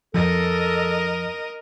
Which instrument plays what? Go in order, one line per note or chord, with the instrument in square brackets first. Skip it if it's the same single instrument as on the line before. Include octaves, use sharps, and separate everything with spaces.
[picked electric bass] F2 F3 [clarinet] A4 [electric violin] A#4 D#5